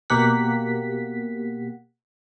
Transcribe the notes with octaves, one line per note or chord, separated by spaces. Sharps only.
B2 A#3 G4 F#5 B6